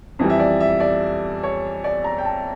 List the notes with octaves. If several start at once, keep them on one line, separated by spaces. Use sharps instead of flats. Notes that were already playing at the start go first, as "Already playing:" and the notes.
F2 E3 G3
E5
D5
E5
D5
C#5
D5
A#5
G5
A5